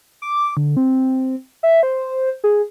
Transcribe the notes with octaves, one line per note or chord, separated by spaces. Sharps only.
D6
D3
C4
E5
C5
G#4